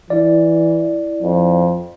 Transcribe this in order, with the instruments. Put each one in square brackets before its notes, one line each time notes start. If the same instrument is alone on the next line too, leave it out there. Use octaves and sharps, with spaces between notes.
[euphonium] E3 [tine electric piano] E4 D5
[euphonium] F2